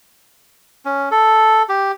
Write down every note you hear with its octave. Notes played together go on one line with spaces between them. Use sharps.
C#4
A4
G4